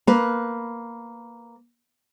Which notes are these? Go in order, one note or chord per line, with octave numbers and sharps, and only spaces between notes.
A#3 B4